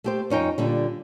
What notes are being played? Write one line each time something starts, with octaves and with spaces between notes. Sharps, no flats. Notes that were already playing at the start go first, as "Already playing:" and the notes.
A3 G4 C5
F2 C#4 D#4 G5
A#2 D3 G3